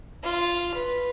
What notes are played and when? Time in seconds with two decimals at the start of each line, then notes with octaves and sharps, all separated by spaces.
0.23 F4
0.74 B4